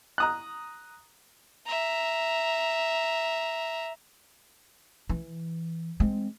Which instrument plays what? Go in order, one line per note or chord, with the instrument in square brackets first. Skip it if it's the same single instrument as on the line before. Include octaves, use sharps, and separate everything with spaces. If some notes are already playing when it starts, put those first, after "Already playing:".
[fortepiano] A#5 D#6 F#6
[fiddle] E5 A#5
[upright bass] E3
G#3 C4